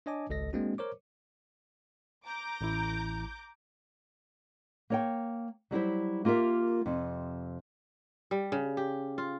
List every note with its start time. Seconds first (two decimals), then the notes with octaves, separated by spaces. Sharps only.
0.06 D4 C#5 D#5 G#5 A5 D6
0.30 G#1 C#2 A4 D#5 A#6
0.53 G#3 A#3 C4 D4 F#4
0.78 A#4 C5 C#5 D6
2.25 A#5 D6 G6
2.61 A1 E4
4.90 A#3 C#5 G5
5.71 F#3 G3 E4 C5
6.25 A#3 F4 G4 A#4 E5
6.86 F2 C3
8.31 G3
8.52 C#3
8.77 G4
9.18 F4